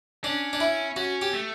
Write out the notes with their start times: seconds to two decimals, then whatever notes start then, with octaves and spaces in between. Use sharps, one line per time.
0.24 C#4 D4
0.53 D4
0.61 E4
0.96 C#4 F#4
1.22 G4
1.34 A3